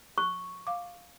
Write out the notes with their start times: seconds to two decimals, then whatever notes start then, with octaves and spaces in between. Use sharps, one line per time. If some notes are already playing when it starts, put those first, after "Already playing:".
0.18 C#6 F#6
0.67 F5 D6